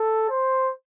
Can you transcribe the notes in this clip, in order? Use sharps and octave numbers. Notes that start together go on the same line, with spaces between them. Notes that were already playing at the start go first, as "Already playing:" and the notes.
Already playing: A4
C5